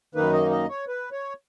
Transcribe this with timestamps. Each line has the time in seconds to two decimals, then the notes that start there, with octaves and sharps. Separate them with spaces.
0.15 F#2 D#3 A#3 D#4 B4
0.33 D#5
0.51 D#5
0.69 C#5
0.88 B4
1.12 C#5